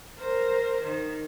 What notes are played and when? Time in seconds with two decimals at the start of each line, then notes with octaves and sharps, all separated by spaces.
0.18 A#4 C5
0.82 D#3